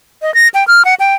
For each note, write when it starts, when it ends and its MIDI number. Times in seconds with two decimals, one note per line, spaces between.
0.22 0.34 75
0.34 0.48 94
0.54 0.66 79
0.68 0.85 89
0.85 0.95 78
1.00 1.15 79